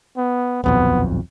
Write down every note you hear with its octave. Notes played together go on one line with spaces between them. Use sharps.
B3
D#1 B1 F2 B3